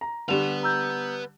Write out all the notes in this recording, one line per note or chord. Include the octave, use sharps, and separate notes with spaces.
A#5
D3 G3 G4 B4 F#5 E7 F7
A#5 E6 G6